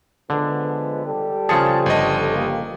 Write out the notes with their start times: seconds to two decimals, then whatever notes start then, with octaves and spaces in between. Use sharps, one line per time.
0.30 D3 F3 G#3 B3
1.06 G3 G4 A4
1.49 C#3 F3 G#4 A5 C#7
1.86 G1 D#5
2.36 A#3 G4